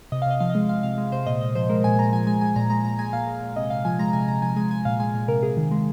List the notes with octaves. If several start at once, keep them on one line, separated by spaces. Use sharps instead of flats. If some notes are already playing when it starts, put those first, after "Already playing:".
C3 D#5
F5
C3 D#5
F3 F5
D#5
G#3
G#3 F5
C3 F5
G#3
C3 C5
A#2 D#5
A#2 D#5
F3 C5
G#3 A#4
A#2 G#5
A#2 A#5
F3 G#5
G#3 G#5
G#3 G#5
A#2 A#5
G#3 A#5
A#2 A#5
G#3 G#5
A#2 F5
G#3
A#2
C3 D#5
C3 F5
F3 G#5
G#3 A#5
C3 G#5
C3 A#5
F3 G#5
G#3 G#5
G#3 G#5
A#2 F5
G#3 G#5
A#2
C3 A#4
C3 G#4
D#3
G#3